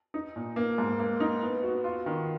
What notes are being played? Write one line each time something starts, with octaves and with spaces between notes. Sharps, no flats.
D#4
A#2
A#3
G#2
A#3
D#4
B3
F#4
F4
D#3